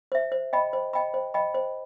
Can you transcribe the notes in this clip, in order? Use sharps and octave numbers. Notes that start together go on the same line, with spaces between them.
C5 E5
C5
D#5 G5 B5
C5
D#5 G5 B5
C5
D#5 G5 B5
C5